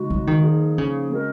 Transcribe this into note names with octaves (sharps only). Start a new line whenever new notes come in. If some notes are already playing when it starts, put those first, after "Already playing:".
Already playing: C#3 G#3 D#4 F#4
F#3
D#3
F3 A#3 D#4 G#4
C#3
G#3 C4 F#4 A#4